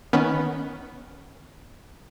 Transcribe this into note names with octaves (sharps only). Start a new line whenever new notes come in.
D#3 B3 C#4